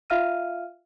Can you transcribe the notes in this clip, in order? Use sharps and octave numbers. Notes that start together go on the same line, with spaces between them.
F4 E5 F5 F6 D#7